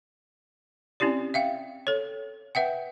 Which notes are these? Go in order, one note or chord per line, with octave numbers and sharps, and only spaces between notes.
C4 C#4 E4 G4 D5
E5 F5 G5
A4 C#5
B4 E5 F#5 G5